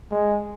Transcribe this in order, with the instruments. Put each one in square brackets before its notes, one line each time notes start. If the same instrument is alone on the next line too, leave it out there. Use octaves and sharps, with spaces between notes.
[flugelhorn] G#3